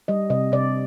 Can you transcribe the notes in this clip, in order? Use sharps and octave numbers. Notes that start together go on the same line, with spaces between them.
G3 D#5
C3 D#5
C3 D5